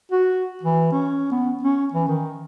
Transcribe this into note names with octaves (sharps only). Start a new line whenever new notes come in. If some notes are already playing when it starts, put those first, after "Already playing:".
F#4
E3
C#4
B3
C#4
E3
D#3